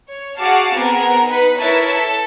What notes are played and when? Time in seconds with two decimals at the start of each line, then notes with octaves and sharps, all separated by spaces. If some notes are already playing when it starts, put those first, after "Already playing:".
0.11 C#5
0.39 F#4 G#4 F5 F#5 A5 D6
0.75 B3 C4 G#4 A#4
1.25 D#4 B4
1.59 E4 A#4 B4 C#5 E5 A5
1.92 A4 A5